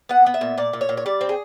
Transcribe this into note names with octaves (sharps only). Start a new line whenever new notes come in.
B3 F#5
B3
E5
A#2
A#2 D5
A#2
C#5
A#2
C#5
G3 D5
C4
G#4